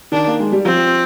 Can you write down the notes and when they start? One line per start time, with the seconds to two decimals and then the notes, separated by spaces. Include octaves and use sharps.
0.12 D#3 D4
0.27 A#3
0.40 G#3
0.52 G3
0.65 F3 C4